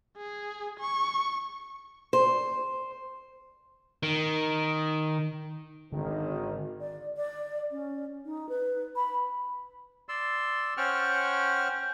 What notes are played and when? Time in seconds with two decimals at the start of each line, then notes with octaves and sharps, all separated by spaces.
0.17 G#4
0.80 C#6
2.13 C5
4.03 D#3
5.92 G#1 D3 D#3
6.80 D5
7.17 D5
7.71 C#4
8.25 D#4
8.49 B4
8.96 B5
10.09 D5 C6 E6
10.77 C#4 C5 F#5 G5 C#6 F6